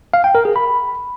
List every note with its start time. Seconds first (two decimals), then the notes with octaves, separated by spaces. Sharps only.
0.14 F5
0.24 G5
0.35 A#4
0.45 G#4
0.56 B5